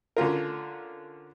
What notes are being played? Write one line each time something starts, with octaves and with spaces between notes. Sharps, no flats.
D3 C#4 F4 A#4